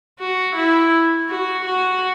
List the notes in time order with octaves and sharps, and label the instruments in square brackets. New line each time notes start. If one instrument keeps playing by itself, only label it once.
[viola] F#4
E4
F#4
F#4